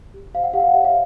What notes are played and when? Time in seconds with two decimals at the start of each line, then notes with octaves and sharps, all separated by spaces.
0.14 G4
0.35 C5 F5
0.44 F#5
0.53 G4 F5
0.60 F#5
0.64 F5
0.74 C#5 E5
0.85 F5